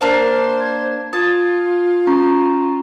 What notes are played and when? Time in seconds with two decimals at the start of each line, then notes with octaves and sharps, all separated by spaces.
0.01 A#3 D4 C5 F5
0.61 G#6
1.13 F4 A5 D#6 G#6
2.07 C#4 A#5 C#6